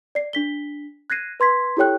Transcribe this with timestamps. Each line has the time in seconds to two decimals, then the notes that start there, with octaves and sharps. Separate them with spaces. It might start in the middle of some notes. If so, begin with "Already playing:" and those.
0.15 D5 C7
0.33 D4 B6 G7
1.10 F#6 G#6 A#6 C7 D#7
1.40 B4 C6 G#6 B6
1.77 E4 G4 A4 C#5 G5 F#6